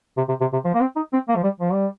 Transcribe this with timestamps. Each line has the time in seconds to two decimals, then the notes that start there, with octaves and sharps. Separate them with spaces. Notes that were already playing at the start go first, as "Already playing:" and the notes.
0.17 C3
0.29 C3
0.41 C3
0.53 C3
0.65 F3
0.74 A#3
0.81 C4
0.96 D#4
1.13 C4
1.29 A#3
1.36 F3
1.44 G3
1.60 F3
1.73 G3